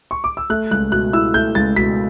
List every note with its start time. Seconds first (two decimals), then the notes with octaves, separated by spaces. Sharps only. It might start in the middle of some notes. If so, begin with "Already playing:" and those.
0.11 C#6
0.24 D6
0.37 E6
0.50 A3 F#6
0.71 C#2 F#6
0.92 B2 F#6
1.13 E4 E6
1.34 A3 G6
1.55 C#2 A6
1.76 B2 B6